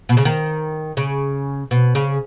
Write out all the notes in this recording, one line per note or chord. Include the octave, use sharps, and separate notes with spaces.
B2
C#3
D#3
C#3
B2
C#3